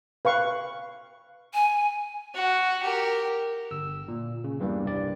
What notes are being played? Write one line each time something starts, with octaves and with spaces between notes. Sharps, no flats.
B4 F5 C#6
G#5
F#4
G4 A#4
G1 E6
A#2
C#3
E2 G2 E3 G3 A#3
C2 G2 D5